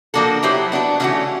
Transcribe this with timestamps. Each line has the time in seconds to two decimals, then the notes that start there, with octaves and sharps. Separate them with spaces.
0.14 F3 A#3 D4 F#4 A4
0.43 F#3 B3 E4 G4 C5
0.72 B3 D4 F#4
1.00 C#3 E3 A3 C#4 F#4